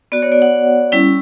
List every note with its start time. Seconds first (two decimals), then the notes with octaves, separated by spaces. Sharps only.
0.12 B3 F#4 D5
0.22 C#5
0.32 D5
0.42 F#5
0.92 G3 C#4 E4